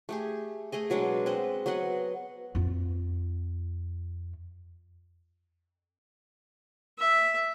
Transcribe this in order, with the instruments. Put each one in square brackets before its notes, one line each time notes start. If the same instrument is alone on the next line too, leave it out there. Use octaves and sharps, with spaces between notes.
[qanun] A3 G4 G#4
A3 G#4 D#5
B2 F#3 G#3 D4
C4 B4 D#5
F#3 B3 D#5 F#5
[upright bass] F2 F4
[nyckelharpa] E5